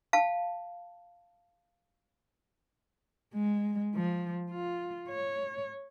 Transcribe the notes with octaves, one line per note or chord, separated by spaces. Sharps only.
F5 A5
G#3
F3
F4
C#5